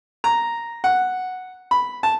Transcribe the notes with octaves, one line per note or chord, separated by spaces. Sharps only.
A#5
F#5
B5
A5